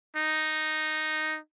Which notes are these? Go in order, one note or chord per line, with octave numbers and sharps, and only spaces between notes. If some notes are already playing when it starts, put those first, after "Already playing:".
D#4